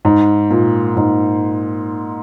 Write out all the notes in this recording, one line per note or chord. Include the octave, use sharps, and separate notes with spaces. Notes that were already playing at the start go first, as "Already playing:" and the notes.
G#2
A#2
G#2